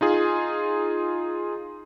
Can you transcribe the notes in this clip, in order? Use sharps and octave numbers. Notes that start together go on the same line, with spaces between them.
D#4 F4 G#4